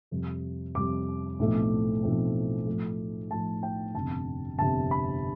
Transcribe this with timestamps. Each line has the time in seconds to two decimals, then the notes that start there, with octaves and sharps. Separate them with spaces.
0.11 F2 C3 G3
0.75 F2 C3 G3 D6
1.39 B1 A2 F3 A3 C4
2.02 B1 A2 F3 A3 C4
2.66 A2 F3 A3
3.31 A2 F3 A3 A5
3.63 G5
3.94 G1 F2 C3 A5
4.58 G1 F2 C3 A5
4.91 B5